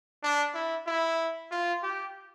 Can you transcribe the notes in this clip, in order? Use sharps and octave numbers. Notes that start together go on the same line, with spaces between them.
D4
E4
E4
F4
G4